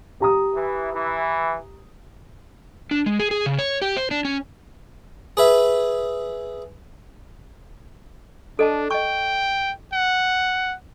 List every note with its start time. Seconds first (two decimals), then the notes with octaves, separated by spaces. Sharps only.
0.20 G4 A#5 D#6
0.54 E3
0.93 E3
2.91 D4
3.06 G#3
3.19 G#4
3.31 G#4
3.46 C#3
3.59 C#5
3.82 G4
3.97 C5
4.11 D4
4.25 C#4
5.37 G#4 B4 E5
8.59 D4 A4 D#5 A5
8.91 D#5 G5 C#6
9.93 F#5